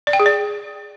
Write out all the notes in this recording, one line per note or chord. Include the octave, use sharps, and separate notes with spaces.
D5
G5
G#4
D5